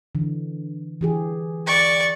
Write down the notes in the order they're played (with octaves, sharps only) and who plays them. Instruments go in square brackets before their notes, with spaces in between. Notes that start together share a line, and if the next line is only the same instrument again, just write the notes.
[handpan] D3 E3
E3 G4 G#4
[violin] D5 C#6